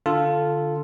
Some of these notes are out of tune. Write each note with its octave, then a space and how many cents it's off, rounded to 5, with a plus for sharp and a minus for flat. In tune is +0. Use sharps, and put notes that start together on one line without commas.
D3 +0 F4 +0 A4 +0